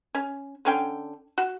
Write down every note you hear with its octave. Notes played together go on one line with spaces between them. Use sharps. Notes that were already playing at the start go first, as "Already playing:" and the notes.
C#4
D3 C#4 G5
F#4